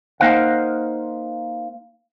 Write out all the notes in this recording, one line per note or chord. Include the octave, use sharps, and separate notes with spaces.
A#3 D#4 C5 F5 F#5